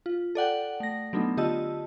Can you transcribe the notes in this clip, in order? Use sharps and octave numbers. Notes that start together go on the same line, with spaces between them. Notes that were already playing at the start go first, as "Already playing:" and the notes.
F4
A4 D5 F#5 G5
A3 A#6
F#3 A3 B3 D4 D#4
D3 F4 G4 D#5 A5 E6